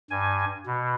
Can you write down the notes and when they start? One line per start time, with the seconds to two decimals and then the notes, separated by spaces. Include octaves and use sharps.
0.11 G2 G#5
0.66 B2